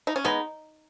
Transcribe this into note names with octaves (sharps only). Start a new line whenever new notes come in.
D#4
C#4
G#3 B3 D#4